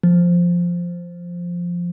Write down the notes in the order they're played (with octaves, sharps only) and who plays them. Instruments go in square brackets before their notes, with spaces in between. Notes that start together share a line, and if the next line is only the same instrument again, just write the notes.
[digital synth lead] F3